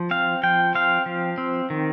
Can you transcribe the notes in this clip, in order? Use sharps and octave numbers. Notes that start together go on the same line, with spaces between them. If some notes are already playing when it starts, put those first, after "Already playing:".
Already playing: F3
C4 F5
F3 G5
C4 F5
F3
C4
D#3